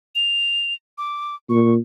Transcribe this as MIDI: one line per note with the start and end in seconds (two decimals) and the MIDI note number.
0.15 0.74 101
0.98 1.35 86
1.49 1.76 46
1.49 1.74 85